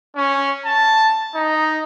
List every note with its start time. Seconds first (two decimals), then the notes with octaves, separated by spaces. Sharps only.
0.16 C#4
0.66 A5
1.35 D#4